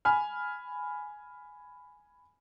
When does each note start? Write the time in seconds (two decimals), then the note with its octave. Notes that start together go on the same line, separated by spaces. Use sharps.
0.05 G#5 B5 F6